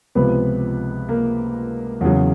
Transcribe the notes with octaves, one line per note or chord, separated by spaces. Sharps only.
C#2 C3 F3 B3 B4
A#3 A#4
E2 C#3 F#3